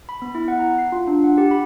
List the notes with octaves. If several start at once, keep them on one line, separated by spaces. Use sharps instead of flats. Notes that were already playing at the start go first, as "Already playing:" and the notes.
B5
B3
E4
F#5
A#5
C7
F4
D4
F#5
G4
B5